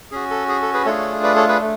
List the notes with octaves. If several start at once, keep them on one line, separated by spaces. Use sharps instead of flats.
C#4 F#4 G#4
A4
G#4
A4
G#4 B4
A3 D4 F4 G#4 A4 C#5
B4 D5
A4 C#5
G#4 B4
A3